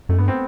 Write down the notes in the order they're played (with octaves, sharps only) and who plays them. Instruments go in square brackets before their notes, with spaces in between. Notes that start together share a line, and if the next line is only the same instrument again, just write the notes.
[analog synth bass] F#2 [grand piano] A3
[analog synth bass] G2 [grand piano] B3
[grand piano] C4